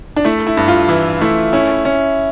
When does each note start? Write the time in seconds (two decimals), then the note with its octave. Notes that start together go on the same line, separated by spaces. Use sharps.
0.16 D4
0.25 A3 E4
0.47 E4
0.57 G2
0.68 F4
0.89 E3 E4
1.21 A3 E4
1.53 C#4 E4
1.85 C#4